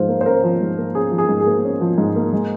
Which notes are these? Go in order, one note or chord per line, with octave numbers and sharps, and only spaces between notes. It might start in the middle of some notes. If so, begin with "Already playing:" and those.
Already playing: G#2 F3 C5 F5
A#3
C5
C#4 A#4
F3
G#2
A#3
C#4 G#4
F3
G#4
G#2
G#4
A#3
C#4
F3
G#2
A#3
G#3